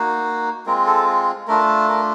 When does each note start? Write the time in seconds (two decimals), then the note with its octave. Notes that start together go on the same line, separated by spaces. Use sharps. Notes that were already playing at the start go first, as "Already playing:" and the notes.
Already playing: A#3 D#4 F#4
0.66 G#3 C4 F4 A#4
0.87 A4
1.48 A3 D4 F4 A#4
1.89 A#4